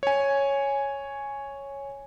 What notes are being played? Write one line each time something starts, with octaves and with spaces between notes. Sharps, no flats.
C#5 G#5